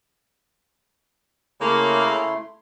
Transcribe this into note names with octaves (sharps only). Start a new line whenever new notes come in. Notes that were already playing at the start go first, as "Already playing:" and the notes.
C#3 A3 A#3 E4 C6